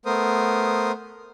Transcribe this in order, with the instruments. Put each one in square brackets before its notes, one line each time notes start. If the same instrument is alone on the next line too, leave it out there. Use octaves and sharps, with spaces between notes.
[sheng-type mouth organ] A3 B3 A#4 C5 D#6